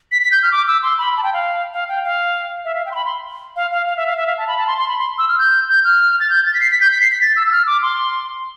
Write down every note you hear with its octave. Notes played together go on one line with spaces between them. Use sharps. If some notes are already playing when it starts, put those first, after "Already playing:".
B6
B6
G6
F6
D6
E6
C6
B5
A5
G5
F5
F5
G5
F5
E5
F5
G5
C6
B5
C6
F5
F5
F5
E5
F5
E5
F5
A5
B5
A5
C6
C6
B5
C6
E6
F6
G6
G6
F6
A6
G6
A6
B6
C7
B6
G6
B6
C7
B6
A6
E6
E6
F6
D6
C6